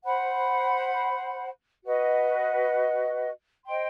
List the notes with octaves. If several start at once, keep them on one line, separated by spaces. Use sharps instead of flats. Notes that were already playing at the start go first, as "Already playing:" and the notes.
C5 F#5 B5
F#4 B4 D#5
C5 D#5 G5 C6